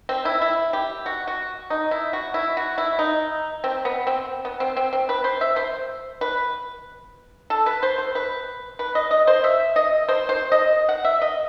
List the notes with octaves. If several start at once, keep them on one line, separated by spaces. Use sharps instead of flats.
C4
E4
E4
G4
F#4
F#4
D#4
E4
F#4
E4
F#4
E4
D#4
C4
B3
C4
B3
C4
C4
C4
B4
C5
E5
C5
B4
A4
B4
C5
C5
B4
B4
D#5
D#5
C5
E5
D#5
C5
C5
D#5
F#5
E5
D#5